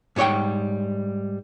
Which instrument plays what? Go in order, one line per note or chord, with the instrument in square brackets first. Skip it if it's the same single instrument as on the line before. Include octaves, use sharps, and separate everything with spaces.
[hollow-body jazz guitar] G#2 G3 C#5 F#5 G5